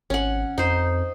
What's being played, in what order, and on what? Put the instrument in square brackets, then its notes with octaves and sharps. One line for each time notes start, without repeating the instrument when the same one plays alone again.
[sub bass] G#1 [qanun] C#4 F#5
[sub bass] F2 [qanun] D#4 C5